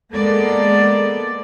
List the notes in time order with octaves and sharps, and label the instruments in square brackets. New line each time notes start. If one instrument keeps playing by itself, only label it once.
[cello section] G#3 A#3 B3 A4 D5